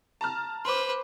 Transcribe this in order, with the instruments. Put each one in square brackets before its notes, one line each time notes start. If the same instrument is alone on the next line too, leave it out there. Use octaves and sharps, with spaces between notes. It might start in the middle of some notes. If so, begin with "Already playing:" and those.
[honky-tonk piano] A5 A#5 F6
[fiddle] B4 C5 [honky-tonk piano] C6 D6